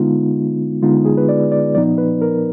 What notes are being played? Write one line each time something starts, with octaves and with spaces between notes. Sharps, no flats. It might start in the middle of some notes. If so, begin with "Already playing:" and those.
Already playing: D3 G#3 B3 D#4 F4
D3 G#3 B3 D#4 F4
G#4
B4
D5
D5
A#2 F3 B3 D#4 D5
B4
A#4